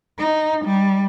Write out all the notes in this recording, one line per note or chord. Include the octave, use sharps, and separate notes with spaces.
D#4
G3